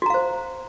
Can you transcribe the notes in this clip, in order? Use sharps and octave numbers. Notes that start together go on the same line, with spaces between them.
F#4 C5 F5 A#5